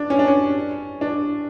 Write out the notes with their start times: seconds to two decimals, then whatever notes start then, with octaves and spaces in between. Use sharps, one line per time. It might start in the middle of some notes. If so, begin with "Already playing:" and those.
Already playing: D4
0.10 C#4
0.19 D4
0.28 C#4
1.01 D4